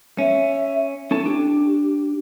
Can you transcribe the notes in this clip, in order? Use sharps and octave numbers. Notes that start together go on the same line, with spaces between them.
C#4 E5
C#4 E4 A4 A5
D4 G4